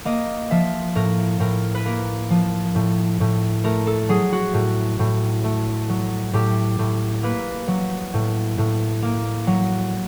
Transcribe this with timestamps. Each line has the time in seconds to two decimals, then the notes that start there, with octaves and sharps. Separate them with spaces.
0.05 A#3 D#5
0.51 F3 E5
0.95 A2 A#4
1.40 A2 A#4
1.75 B4
1.85 A#3 A#4
2.30 F3
2.75 A2
3.20 A2
3.64 A3 A#4
3.87 A4
4.09 F#3 G#4
4.32 F#4
4.54 A2
4.99 A2
5.44 A3
5.89 F#3
6.33 A2 G4
6.79 A2
7.23 A#3 B4
7.68 F#3
8.14 A2
8.58 A2
9.02 A#3
9.47 F#3